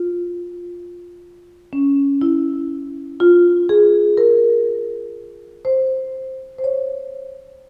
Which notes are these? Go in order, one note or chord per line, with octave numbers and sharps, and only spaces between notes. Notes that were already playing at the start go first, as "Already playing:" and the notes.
Already playing: F4
C#4
E4
F4
G#4
A#4
C5
C5
C#5